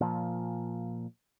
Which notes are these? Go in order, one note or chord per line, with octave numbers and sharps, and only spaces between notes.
A#2 F3